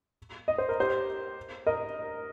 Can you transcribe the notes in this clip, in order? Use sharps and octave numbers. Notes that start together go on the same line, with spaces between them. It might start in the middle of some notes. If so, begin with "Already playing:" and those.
D#5
C5
A#4
G4 C5
A#4 D#5